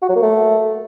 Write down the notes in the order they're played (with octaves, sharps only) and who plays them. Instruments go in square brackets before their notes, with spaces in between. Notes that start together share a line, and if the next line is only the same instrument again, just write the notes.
[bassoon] F#4
F#3
A#3
A3